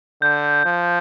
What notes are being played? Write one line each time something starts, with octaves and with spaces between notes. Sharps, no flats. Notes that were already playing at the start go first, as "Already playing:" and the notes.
D3 G6
F3